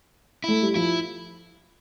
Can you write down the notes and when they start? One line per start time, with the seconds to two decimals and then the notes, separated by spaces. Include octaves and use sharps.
0.44 A3 E4
0.62 G3
0.75 F3 E4